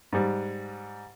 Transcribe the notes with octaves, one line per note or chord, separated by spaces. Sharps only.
G#2 G3